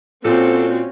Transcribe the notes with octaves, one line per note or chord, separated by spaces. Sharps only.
A#2 C4 C#4 F#4 A4